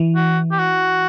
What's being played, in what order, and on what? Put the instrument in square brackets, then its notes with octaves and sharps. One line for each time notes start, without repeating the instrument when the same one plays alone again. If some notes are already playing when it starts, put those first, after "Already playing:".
Already playing: [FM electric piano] E3
[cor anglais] F#4
G4
F#4